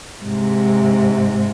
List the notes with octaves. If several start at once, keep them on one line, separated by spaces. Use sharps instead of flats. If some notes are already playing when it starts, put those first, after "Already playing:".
G#2 C3